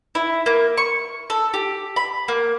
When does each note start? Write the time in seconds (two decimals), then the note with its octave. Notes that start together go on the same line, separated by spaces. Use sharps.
0.15 E4
0.46 A#3
0.77 C#6
1.30 A4
1.54 G4
1.96 B5
2.28 A#3